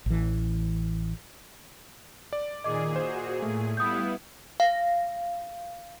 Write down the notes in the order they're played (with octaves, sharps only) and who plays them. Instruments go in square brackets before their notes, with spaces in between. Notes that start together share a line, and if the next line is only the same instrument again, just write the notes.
[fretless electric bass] A1 E3
[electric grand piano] D5
[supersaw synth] A#2 G#4 [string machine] D#3 [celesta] D#5 D6
[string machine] F#4 [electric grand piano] C5
[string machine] A2 [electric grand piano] A3
[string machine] G3 F5 [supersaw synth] B3 E4 [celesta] D#6 G6
[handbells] F5